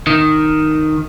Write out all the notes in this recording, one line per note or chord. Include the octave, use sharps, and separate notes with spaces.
D#3